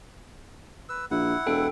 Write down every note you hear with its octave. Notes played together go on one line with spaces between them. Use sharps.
B4 E6
A#1 E4 F#5
E1 A4 G5